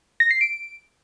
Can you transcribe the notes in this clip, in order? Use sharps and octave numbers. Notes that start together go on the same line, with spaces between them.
A#6
C7
D7